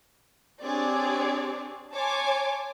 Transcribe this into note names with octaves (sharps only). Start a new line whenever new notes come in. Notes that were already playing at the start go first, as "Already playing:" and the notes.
C4 D4 G4 G#4 C#5 D5
C#5 G#5 A5 C6 D6